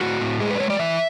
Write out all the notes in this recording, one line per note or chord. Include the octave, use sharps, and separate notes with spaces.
A2 F#4
A2
G#3 G#4
B4
D5
G#3 C#5
D5
E3 E5